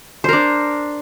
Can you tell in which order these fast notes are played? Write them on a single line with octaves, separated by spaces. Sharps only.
C5 A#4 D4